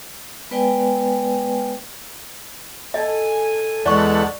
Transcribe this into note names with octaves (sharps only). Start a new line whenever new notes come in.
G#3 B3 B4 D5 G5 G#5
A4 D#5 G#5
E2 G#3 A4 D5 F#5 C#6